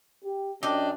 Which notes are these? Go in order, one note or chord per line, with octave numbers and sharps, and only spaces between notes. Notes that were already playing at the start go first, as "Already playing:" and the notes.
G4
F#2 D4 G4 D#5